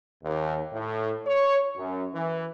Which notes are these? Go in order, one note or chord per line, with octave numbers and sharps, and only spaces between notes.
D#2
A2
C#5
F#2
E3